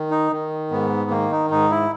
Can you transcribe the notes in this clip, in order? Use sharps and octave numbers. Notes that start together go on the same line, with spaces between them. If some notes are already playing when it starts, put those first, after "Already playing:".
Already playing: D#3
D#4
D#3
G#2 B3
D#3 A#3
D#4
G#2 D#4
E4